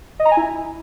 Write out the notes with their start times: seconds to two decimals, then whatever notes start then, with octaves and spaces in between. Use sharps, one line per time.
0.20 D#5
0.25 A#5
0.31 G#5
0.37 E4